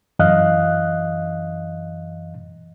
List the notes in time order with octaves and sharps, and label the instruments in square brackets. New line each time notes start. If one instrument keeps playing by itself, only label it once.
[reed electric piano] F#2 E3 D#5 F5 F#6